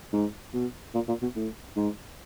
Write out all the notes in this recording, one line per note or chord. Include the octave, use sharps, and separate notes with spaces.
G#2
B2
A#2
A#2
B2
A2
G#2